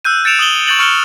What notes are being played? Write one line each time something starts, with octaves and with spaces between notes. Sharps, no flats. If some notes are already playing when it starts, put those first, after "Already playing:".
E6 F#6 G6 D#7
G6 A6 C#7 D7 E7 F7
D#6 F#7 G7
C#6 G6 A6 F#7
C#6 F6 C#7 E7 F#7 G7